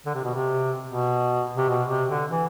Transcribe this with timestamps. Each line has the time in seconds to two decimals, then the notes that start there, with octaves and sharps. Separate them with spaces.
0.06 D3
0.15 C3
0.24 B2
0.34 C3
0.87 B2
1.57 C3
1.69 B2
1.89 C3
2.10 D3
2.30 E3